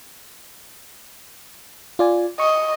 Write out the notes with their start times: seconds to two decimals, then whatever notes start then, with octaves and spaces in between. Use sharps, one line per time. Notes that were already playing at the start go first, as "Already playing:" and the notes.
1.99 F4 D5 G#5
2.40 D#5 C#6